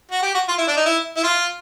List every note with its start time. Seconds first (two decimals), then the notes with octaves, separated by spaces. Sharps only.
0.11 F#4
0.22 G4
0.34 F#4
0.48 F4
0.58 E4
0.68 D4
0.77 D#4
0.86 E4
1.17 E4
1.23 F4